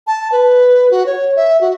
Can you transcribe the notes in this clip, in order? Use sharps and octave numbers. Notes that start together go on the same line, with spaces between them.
A5
B4
F#4
C#5
E5
F#4